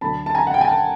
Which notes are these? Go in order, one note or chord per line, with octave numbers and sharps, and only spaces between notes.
D2 D3 F#3 A5 B5
A5
G#5 A#5
F#5
G5
G#5
G5 A5